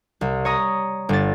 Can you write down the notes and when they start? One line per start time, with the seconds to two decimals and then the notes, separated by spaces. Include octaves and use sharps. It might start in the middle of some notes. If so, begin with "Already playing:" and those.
0.21 C2
0.45 C#5 A#5 D#6
1.09 G1 A6